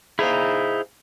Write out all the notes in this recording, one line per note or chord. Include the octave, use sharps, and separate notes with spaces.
D#4 E4 G#4 C5 F5